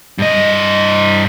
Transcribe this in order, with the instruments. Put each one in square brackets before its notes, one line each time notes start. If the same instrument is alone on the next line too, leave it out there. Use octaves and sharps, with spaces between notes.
[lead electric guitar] G2 D#5